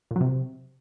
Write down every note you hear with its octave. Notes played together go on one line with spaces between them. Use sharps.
A#2
F#3
C3